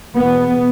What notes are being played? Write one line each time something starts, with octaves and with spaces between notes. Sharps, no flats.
E2 B2 B3